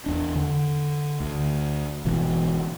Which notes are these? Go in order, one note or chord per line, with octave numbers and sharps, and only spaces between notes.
E2 D4
D3
D2
G1 B2 E3 B3